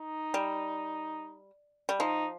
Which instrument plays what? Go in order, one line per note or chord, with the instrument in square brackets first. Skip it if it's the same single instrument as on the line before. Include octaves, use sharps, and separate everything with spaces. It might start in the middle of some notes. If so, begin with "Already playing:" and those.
Already playing: [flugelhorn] D#4
[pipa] G3
G3
[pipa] F3 [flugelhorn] D#4